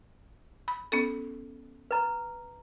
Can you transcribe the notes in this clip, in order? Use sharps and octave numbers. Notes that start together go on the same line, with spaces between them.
B5
B3 C#4 A4
B4 A#5